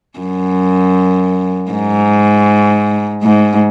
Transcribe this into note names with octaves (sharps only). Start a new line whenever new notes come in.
F#2
G#2
G#2